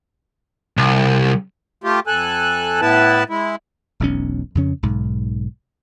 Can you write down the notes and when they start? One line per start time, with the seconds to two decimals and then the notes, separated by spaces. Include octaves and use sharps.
0.77 C2
1.84 A3 F4 G4
2.07 F2 A4 G#5 F#6
2.81 A2 B3 E4 B4 A5
3.30 G#3 E4
4.00 E1 B1 C#4
4.55 F2 C#3 C#4
4.83 B1 G#2